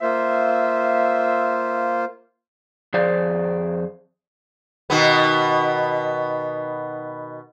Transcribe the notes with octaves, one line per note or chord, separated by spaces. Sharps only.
A#3 F4 C5 E5
F2 F3 G#4 C5 D5
B2 D#3 B3